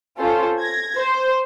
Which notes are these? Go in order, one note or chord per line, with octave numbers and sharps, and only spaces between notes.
C#4 F4 A4 C5
G#6 A#6
C5